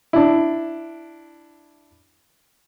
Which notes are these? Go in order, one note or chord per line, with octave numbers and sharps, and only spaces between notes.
D4 E4